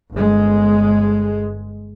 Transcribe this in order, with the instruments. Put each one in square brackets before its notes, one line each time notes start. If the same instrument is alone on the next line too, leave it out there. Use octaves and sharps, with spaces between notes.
[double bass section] G1 G#3